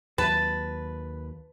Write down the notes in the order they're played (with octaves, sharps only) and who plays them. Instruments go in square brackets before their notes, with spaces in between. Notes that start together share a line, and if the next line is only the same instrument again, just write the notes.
[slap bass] D#2 F#3 [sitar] B4 [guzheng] A5